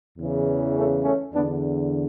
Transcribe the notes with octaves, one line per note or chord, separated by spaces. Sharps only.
E2 C#3 E3
A3 C#4
A3 C#4
E2 D3 B3 D4